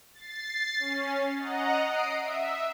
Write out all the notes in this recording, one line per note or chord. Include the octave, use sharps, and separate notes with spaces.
A6 C7
C#4
D#5 F#5 A#5
D#6 C7 D7
E5